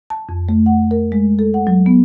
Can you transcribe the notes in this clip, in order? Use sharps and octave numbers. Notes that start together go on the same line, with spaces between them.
A5
F2
A3
F#5
A#4
G#3
A4
F#5
F#3
B3